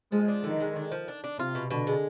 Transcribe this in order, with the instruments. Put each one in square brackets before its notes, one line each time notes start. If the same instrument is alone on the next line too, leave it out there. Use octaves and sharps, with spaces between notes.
[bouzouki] F3 [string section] G#3
[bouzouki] D4
[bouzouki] D3 [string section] D#3
[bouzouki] G#3
D4
F3
D4
D4
[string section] C3 [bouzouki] F4
[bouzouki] B2
[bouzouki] B2 [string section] D3
[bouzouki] G#3